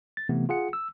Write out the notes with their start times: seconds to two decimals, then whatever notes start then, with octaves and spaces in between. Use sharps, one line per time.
0.17 A6
0.29 C3 E3 A3 B3
0.49 F4 G#4 F#5 C#7
0.73 E6